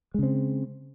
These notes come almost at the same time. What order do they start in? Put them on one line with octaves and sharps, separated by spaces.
G#3 C#3 C4